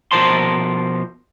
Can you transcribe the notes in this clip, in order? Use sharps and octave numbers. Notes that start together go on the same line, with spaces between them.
B2 F3 A#4 C5 A5 C6